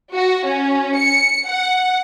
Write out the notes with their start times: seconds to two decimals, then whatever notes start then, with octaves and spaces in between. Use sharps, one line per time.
0.14 F#4
0.46 C#4
0.95 C#7
1.48 F#5